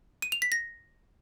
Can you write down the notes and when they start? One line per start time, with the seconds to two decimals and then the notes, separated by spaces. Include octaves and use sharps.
0.22 D#7
0.32 F7
0.42 B6
0.52 A#6